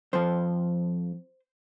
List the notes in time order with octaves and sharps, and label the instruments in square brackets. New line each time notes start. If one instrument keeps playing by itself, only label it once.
[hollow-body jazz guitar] F2 F3 C5